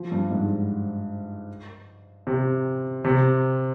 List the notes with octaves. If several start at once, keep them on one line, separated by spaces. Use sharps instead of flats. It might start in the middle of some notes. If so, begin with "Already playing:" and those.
Already playing: F3
G2
G#2
C3
C3